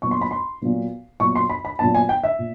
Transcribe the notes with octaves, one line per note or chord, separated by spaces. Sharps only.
A#2 F#3 B3 C#6
C6
B5
C6
A#2 F#3 B3
A#2 F#3 B3 C#6
C6
B5
B5
A#2 F#3 B3 A5
G#5
G5
E5
A#2